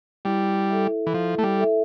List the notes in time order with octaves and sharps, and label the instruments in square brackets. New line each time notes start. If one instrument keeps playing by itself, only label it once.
[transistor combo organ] G3 [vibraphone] E4
[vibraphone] A4 E5
[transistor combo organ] E3
[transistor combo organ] F3 [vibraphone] E4
[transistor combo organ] A3
G3
[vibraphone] A4 E5